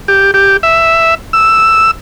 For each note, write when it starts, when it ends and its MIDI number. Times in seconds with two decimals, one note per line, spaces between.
0.08 0.31 67
0.34 0.57 67
0.63 1.15 76
1.33 1.91 88